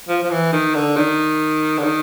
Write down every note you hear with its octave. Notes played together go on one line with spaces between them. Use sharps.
F3
F3
E3
D#3
D3
D#3
D3
D#3